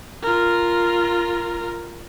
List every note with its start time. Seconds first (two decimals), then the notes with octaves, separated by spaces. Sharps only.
0.23 F4 A#4